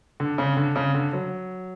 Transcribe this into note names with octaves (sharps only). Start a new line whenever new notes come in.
D3
C#3
D3
C#3
D3
F#3